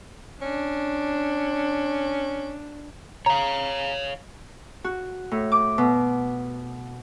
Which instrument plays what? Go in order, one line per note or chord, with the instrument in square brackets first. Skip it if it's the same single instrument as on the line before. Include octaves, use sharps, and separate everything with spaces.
[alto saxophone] C#4 [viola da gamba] D4
[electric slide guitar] C#5 F5 [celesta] A#5
[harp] F#4
A2
D6
B2